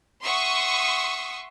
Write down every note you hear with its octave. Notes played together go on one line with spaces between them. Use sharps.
E5 F#5 C6 C#6 D#6